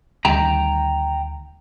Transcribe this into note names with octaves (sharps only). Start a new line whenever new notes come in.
D2 D#3 G3 G5 A#5